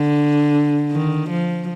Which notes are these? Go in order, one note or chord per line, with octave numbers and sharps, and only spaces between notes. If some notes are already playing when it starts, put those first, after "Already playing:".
Already playing: D3
D#3
F3